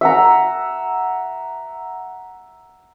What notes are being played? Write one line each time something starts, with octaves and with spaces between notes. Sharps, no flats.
E5 F#5 A#5